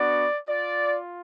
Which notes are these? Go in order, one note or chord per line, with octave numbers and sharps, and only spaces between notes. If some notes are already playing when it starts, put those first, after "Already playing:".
Already playing: B3 D4 F#4 D5
F4 D5